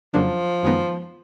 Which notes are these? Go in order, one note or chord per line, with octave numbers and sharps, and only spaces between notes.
F2 C#3 F3 F#3 A#3 D4
F#2 D#3 G#3 B3 D#4